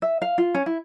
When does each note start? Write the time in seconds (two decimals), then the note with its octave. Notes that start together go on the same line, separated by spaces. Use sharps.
0.02 E5
0.22 F5
0.38 F4
0.55 C#4
0.66 E4